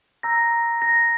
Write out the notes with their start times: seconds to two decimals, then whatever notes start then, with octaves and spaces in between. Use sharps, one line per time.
0.23 A#5 E6 G6 A#6
0.82 A#6